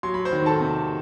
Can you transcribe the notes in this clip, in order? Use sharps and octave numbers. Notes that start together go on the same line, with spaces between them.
F#3 C6
B5
C5 C6
D#3
A4 A5
C3